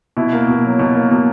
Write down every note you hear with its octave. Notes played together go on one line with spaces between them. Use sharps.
B2 E4
A#3
B2
F#3
B2
A#3
B2